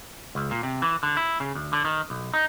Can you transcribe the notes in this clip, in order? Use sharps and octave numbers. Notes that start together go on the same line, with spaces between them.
C#2
A#2
C3
E3
D3
E4
C#3
D2
D3
D#3
B1
D#4